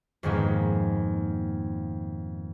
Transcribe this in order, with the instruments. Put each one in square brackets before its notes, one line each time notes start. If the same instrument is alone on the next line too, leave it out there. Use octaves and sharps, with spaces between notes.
[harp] F2 G#2 D#3 G#3 A#3 B3